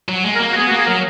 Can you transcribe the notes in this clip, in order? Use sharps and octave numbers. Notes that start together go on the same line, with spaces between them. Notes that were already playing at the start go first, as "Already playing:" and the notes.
F#3
G#3
A#4
A#3
F#4
B3 G#4
A#3 F#4
G#4
F#3 A#4